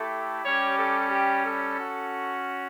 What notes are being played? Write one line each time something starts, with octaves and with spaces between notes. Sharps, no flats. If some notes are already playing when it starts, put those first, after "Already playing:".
Already playing: A3 E4 G4 A4
G3 C#4 G4 C#5
A4
G4
A4
C#4 F#4